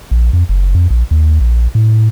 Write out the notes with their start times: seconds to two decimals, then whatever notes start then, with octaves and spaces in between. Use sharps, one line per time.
0.11 A#1
0.33 F2
0.49 F#1
0.75 F2
0.90 A#1
1.11 D#2
1.41 A#1
1.75 A2